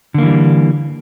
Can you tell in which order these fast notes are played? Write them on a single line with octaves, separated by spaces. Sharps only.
D3 A#3 E3 G3